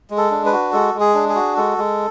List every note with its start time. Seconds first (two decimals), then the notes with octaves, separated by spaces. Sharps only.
0.10 G#3
0.17 A4
0.31 D4
0.45 B4
0.52 F#4
0.72 G#3 A4
0.94 G#3
1.00 G#4
1.14 D4
1.29 G#4
1.35 F#4
1.56 G#3 A4
1.78 G#3